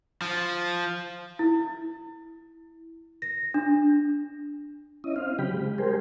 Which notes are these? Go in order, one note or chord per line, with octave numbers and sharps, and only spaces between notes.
F3
E4
A#6
D4
C#4 E4 D#5
C4 F5
C#3 F#3 G4 G5 B5
G#3
G3 G4 G#4 A#4 C5